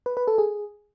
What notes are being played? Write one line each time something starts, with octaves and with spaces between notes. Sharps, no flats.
B4
B4
A4
G#4